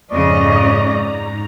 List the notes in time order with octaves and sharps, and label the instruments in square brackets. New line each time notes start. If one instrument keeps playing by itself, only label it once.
[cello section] F2 C#3 D#5 [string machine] G#2 A#5 [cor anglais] D5 [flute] C#6